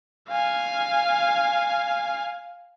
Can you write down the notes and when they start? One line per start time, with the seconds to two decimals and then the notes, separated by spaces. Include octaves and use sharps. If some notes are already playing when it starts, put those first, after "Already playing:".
0.29 F5 G#5